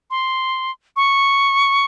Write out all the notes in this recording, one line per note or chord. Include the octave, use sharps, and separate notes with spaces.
C6
C#6